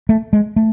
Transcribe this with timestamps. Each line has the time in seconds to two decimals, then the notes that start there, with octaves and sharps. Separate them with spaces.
0.09 A3
0.33 G#3
0.56 A3